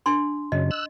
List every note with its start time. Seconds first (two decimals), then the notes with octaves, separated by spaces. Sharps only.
0.06 D4 C6
0.52 F#2 C#3 D#5
0.71 E6 F#6